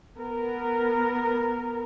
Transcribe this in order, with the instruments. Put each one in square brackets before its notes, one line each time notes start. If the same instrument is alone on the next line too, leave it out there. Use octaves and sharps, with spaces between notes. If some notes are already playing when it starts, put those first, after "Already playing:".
[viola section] B3 A#4